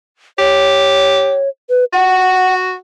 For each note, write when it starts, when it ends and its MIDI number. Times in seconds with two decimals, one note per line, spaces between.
0.38 1.40 67
0.38 1.49 73
1.70 1.85 71
1.93 2.74 66
1.93 2.54 78